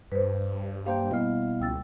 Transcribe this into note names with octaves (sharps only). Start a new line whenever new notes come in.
G2 B4 C5
A#3 G4 C5 F5 G5
B2 G3 E4 F5
C#2 G5 E6 A6